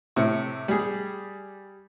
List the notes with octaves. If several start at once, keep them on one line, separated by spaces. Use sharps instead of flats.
A2 C3
G3 G#4